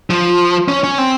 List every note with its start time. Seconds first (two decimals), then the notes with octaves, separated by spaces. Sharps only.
0.10 F3
0.68 C#4
0.84 C#4
0.98 C4